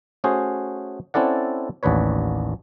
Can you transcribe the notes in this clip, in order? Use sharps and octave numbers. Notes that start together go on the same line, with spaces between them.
A3 C#4 F#4 G#4 C5
C4 C#4 E4 A4 D5 F#5
A1 D#2 D4 B4 C#5